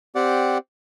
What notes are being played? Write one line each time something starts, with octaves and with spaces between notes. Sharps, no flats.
C4 G4 D5 F#5